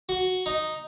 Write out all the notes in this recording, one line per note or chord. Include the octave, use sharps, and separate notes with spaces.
F#4
D#4